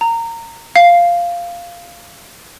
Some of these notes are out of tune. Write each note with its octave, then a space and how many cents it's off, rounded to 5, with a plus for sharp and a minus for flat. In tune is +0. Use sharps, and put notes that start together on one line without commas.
A#5 -20
F5 -5